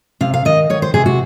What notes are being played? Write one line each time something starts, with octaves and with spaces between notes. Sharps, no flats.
C3 F5
F5
D#3 D#5
D#3 C#5
C5
C3 G#4
F#4